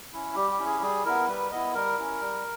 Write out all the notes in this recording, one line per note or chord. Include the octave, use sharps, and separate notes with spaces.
C#4 E4
G3 G4
G4
C#4 E4
G#4
G3 G#4
B3 E4 A#4
G3 B4
B3 E4 D#5
G3 A#4
C#4 E4
G3